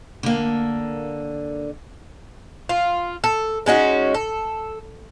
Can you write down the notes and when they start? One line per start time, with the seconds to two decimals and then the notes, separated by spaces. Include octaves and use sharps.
0.23 D3 A#3
2.69 F4
3.24 A4
3.66 G#3 C#4 D#4 F#4
4.14 A4